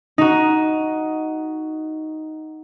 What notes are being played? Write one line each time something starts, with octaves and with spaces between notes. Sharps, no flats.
D#4 F#4